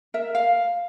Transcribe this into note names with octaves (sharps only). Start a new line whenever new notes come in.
A#4 E5
F5